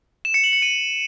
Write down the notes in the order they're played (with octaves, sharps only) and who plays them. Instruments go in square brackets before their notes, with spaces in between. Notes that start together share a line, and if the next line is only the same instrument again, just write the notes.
[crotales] E7
C#7
F#7
C#7
D#7